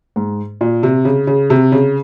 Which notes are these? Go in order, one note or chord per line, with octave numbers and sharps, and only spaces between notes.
G#2
A#2
C3
C#3
C#3
C3
C#3